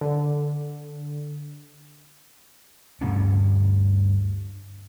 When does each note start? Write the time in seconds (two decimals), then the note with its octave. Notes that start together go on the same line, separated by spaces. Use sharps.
0.01 D3
3.01 D2 G2 A#3 C#4